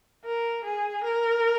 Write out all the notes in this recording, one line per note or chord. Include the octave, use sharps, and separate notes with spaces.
A#4
G#4
A#4